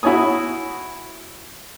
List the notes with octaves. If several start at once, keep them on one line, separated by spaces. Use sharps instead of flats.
E4 F#4 C#5 G#5 D#6